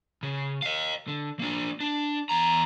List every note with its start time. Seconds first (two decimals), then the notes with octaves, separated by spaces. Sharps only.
0.23 C#3
0.62 D#5 F5
1.08 D3
1.39 A#3 D4
1.80 D4
2.29 E2 A#5